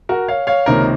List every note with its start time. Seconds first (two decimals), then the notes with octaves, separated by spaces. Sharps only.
0.09 F#4 A#4
0.28 C#5 F5
0.47 C#5 F5
0.66 C#2 C3 D#3 A#3 A#4 C#5